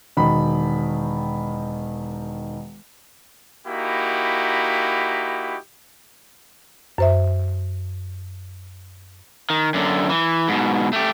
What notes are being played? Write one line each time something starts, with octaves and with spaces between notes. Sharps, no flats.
E1 D#3 B5
A#3 D#4 E4 F#4 G4 B5
F#2 C5 E5
D#3
F#2 D3
E3
G#2 B2
A3 G4